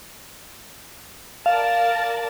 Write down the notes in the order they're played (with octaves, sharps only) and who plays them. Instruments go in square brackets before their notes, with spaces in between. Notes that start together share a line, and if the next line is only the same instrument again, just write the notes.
[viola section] A#4 D5 A5 [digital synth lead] F5